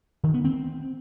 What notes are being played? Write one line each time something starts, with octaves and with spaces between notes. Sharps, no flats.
D#3
B3
C4